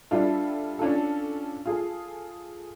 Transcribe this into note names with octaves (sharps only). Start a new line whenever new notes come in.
G3 D4 E4 F4 A4
C#4 D4 F4 A4
F4 G#4 A4